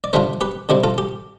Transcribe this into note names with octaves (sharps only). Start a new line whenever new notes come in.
D5
D3 G3 D4 F4 C5 E5
G4 B4
D3 G3 C4 E4 G4
F4 A4
G4